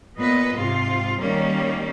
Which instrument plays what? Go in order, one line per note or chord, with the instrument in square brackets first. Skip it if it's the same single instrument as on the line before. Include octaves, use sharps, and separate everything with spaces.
[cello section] A#2 B3 B4 D#5
G#2 C3 F4
D#3 G3 A#3 C#4